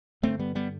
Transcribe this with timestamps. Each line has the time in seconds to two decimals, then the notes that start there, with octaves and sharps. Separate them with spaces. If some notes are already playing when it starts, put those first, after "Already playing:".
0.23 G2 D3 A3 C4
0.39 G3 B3
0.55 G3 B3